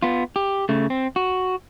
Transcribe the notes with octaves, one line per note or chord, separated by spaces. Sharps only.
B3 F4
G4
C#3 A3
C4
F#4